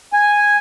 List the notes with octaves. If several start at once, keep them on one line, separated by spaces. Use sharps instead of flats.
G#5